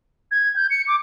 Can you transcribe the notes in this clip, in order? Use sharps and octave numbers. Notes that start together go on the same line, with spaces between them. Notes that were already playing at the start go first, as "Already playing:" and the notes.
G#6
G6
C#7
D6